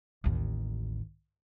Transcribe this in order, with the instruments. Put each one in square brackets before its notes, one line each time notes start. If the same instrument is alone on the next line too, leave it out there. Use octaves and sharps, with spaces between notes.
[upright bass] A1 D#2